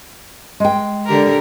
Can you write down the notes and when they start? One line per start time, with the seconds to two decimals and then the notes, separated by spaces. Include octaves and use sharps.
0.60 G#3 G5
1.06 D3 G4 A#4